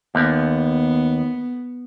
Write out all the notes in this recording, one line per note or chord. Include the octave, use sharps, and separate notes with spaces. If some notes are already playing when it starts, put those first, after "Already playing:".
D#2 B3